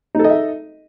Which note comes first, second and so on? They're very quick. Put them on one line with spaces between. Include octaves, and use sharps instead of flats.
D#4 A4 D#5 E5